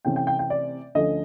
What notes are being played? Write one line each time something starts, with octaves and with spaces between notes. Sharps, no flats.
C3 E3 A3 C#4 G5
G5
G5
G5
D5
D2 D3 F3 A3 C#4 D#5